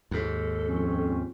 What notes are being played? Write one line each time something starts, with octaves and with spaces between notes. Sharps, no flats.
D#2 G#2 A4
F2 C4 C#4